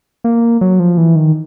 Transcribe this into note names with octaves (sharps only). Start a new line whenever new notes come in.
A#3
F#3
F3
E3
D#3